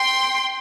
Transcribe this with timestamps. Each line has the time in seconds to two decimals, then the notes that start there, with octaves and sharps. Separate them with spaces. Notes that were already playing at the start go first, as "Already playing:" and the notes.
Already playing: G5 C6